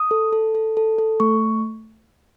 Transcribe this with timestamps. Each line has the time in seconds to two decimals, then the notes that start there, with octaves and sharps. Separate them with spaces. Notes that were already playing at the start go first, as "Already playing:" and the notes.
Already playing: D#6
0.11 A4
0.33 A4
0.55 A4
0.77 A4
0.99 A4
1.20 A3 C#6